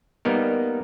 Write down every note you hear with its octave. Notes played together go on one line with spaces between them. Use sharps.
G3 A#3 B3 D#4 A#4